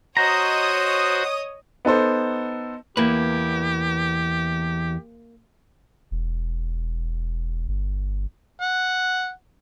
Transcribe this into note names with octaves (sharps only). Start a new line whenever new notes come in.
F#4 C5 C#5 D#5 A#5 D#6
B3 D#4 A4 C5
E2 A#3 E4 G4 B4
E1
G1
F#5